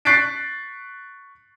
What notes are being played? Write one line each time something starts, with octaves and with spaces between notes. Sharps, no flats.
C#6 F#6 A6 B6 C7 D7